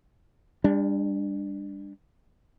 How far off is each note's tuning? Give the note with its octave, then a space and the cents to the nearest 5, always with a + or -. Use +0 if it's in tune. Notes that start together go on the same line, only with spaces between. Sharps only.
G3 +35 D4 +0